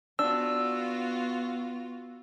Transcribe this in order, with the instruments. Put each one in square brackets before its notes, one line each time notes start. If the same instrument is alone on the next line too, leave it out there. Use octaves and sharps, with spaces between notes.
[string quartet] B3 F4 F#4 [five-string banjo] D4 [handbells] E6